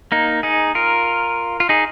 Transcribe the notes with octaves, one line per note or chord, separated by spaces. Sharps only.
A#3 D#4
D#4 G#4
F4 A#4
F4
D#4 G#4